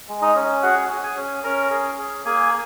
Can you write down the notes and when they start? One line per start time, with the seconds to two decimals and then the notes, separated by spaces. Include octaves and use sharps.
0.08 G#3
0.22 D#4 D#5
0.35 C#4
0.63 F#4 G#4 F#5
0.90 G#4
1.03 G#4 G#5
1.16 C#4
1.44 C#4 A#4 A#5
1.71 G#4
1.98 G#4
2.25 A#3 G#4 G#5